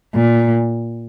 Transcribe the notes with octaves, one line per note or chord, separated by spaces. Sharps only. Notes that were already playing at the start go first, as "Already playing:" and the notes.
A#2